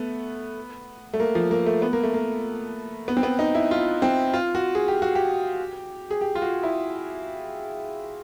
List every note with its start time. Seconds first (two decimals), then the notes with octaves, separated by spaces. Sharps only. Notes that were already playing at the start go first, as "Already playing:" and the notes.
Already playing: A3 B3
1.14 A3
1.20 A#3
1.35 F3
1.51 A#3
1.66 A3
1.82 B3
1.93 A#3
2.03 A3
2.14 A#3
3.08 B3
3.17 C4
3.23 B3
3.39 D#4
3.55 E4
3.71 F4
4.02 C4
4.34 F4
4.55 F#4
4.75 G#4
4.88 G4
5.02 F#4
5.15 G4
6.10 G#4
6.21 G4
6.35 F4
6.42 F#4
6.63 E4